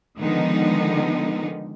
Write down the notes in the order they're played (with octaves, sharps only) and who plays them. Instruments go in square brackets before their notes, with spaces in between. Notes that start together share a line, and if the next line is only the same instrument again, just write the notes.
[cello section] D3 D#3 F3 G#3 B3 D#4